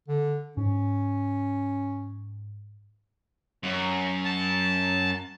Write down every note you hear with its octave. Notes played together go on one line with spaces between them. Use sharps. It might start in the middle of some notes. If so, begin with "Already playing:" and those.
D3
G#2 C#4
F#2
A5